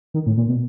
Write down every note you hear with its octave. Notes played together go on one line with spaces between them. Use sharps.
D#3
A2
A#2
B2